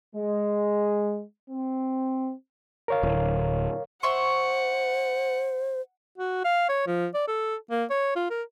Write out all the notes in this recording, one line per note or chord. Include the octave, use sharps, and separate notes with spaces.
G#3
C4
A#4 C#5 F5
D1
C5 E5 F#5 C6 C#6
F#4
F5
C#5
F3
D5
A4
A#3
C#5
F4
A#4